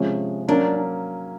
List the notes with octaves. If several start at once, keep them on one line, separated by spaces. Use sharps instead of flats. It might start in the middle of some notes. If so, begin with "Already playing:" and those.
Already playing: C3 F3 G#3 C#4
F#3 A#3 C#4 D4